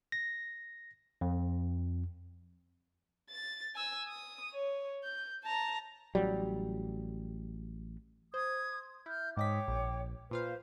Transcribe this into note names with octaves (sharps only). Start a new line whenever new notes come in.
A#6
F2
A6
G#5 E6
D#6
C#5
G6
A5 A#5
A1 F#3 G3
C5 D#6 G#6
E4 F6 G6
G#2 C#5 D#5 G5 D6 B6
A#1
A#2 F4 B4 C5 F5